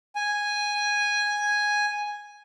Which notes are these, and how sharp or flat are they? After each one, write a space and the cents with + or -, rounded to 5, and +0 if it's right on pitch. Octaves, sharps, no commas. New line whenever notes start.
G#5 -5